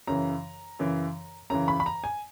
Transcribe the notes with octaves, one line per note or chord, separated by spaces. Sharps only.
F#2 C#3 E3 A#5
F#2 C#3 E3
F#2 C#3 E3 A#5
B5
B5
A#5
G#5